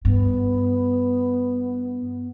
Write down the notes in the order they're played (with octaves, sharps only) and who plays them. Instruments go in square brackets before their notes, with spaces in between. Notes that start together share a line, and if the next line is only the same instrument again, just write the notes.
[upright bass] G2 [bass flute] B3